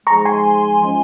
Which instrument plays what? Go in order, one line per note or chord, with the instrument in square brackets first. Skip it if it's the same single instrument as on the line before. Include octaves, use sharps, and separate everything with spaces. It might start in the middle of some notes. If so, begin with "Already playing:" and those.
[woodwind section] G#2 F3 G#3 [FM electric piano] A#5 C#6
[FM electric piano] G#5 C6
[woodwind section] F3 G#3 C#4